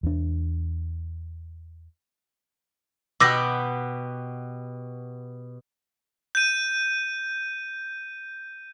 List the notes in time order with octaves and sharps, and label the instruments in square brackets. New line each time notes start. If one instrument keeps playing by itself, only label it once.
[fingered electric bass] E2 D4
[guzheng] B2 B3 G4 [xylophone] D6 E6 A#6
[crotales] G6 D#7